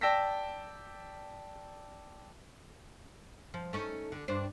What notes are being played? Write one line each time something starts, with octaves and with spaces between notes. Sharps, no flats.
D5 G5 A5 E6 A#6 B6
F3
A3 C#4 D#4
D3
G2 D4 C5